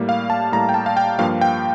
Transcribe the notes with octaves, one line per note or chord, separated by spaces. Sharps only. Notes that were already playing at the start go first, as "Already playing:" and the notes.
Already playing: A2 G3 A#3
F5
A5
A2 G3 A#3 A#5
G5
A5
F5
G5
G2 F3 A#3 F5
G5